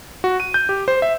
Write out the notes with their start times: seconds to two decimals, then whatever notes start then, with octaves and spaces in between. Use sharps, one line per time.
0.24 F#4
0.40 D#7
0.54 G6
0.69 G4
0.88 C5
1.02 E5